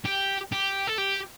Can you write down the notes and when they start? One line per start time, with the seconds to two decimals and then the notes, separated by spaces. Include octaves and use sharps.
0.05 G4
0.52 G4
0.87 A4
0.98 G4